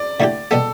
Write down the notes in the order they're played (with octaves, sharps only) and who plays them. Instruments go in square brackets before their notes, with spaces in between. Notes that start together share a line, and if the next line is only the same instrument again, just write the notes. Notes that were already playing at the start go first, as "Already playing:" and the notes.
Already playing: [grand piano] D5
[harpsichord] D3 A3 E4 G4
[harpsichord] B2 G3 B3 [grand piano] A4